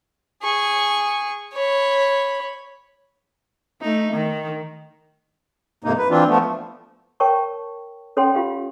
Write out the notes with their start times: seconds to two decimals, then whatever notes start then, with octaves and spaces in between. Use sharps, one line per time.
0.43 G#4 C#6
1.54 C#5 B5
3.81 A3 D#4
4.13 D#3
5.84 F2 G#2 C3 A#3 D#4
5.98 B4
6.10 E3 C4 D4 F4
6.27 F3 A3 B3
7.20 A#4 C#5 G5 A5 C#6
8.17 C#4 A4 C#5 F#5 G5 C6
8.35 F4 G4 F5